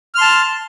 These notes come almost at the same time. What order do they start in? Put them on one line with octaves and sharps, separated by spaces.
F6 C6 A5